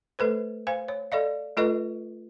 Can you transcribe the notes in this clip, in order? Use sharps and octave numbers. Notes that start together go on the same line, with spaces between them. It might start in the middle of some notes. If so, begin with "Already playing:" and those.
A3 A4 B4 C5
C5 F5 G#5
C#5
A4 D5 D#5 F5
A3 F4 A4 B4 D#5